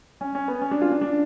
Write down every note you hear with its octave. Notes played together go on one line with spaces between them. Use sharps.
C#4
C#4
B3
C#4
D4
F4
D4
D4